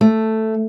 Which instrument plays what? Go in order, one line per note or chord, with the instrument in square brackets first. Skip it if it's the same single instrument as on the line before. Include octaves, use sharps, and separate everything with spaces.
[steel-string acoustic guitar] A3